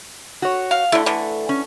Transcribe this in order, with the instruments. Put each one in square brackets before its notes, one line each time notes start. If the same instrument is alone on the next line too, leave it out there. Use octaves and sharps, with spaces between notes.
[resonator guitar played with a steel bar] F#4 C#5
[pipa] F5
[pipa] D3 E4 [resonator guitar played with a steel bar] A3
[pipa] D3 E3
[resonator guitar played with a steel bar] C#4